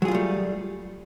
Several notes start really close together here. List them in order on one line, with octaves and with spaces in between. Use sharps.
F#3 G#4 F4 G3 A3